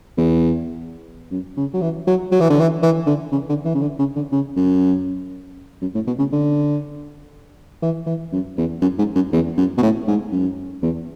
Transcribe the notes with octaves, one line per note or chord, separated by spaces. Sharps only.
E2
F#2
C#3
F#3
E3
F#3
F#3
E3
D3
E3
E3
D3
C#3
D3
E3
C#3
D3
C#3
D3
C#3
F#2
F#2
A2
B2
C#3
D3
E3
E3
F#2
E2
F#2
G#2
F#2
E2
F#2
B2
A2
G#2
F#2
E2